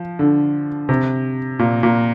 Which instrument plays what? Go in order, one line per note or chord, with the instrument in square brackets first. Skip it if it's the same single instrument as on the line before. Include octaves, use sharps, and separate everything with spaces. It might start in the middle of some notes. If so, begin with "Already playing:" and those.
Already playing: [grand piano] F3
D3
C3
A#2
A#2